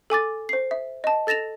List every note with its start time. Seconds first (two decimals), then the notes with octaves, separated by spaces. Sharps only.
0.10 A4 G#5 D6 A6
0.49 C5 C7
0.71 E5
1.04 D#5 A5
1.27 A4 A6 A#6 E7 F7